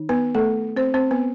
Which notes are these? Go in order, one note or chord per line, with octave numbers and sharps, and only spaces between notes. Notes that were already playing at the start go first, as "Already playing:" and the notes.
Already playing: D#3 D#4
B3 B4
A3 A4
C4 C5
C4 C5
B3 B4